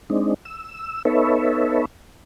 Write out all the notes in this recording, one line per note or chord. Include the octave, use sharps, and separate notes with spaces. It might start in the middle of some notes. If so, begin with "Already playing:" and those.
G#3 C4 D4 D#4
E6
B3 D#4 A4 B4 C#5 E5